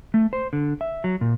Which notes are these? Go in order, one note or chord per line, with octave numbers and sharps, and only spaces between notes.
A3
C5
D3
E5
F#3
A#2